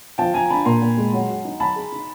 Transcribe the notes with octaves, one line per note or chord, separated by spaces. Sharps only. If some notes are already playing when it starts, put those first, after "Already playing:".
F3 G5 A5
F3 G#5 A#5
A#5
D4 A5 B5
A#2 A#5 C6
A#2
G#3
F#3
F#4
D#4
F#3 A5 B5
G#4
D#4